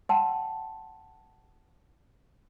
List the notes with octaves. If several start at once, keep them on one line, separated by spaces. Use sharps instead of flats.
F#5 G5 A5 C6